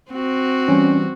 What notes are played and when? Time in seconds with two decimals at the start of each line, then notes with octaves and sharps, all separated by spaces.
0.11 C4 F#4
0.68 E3 G3 C#4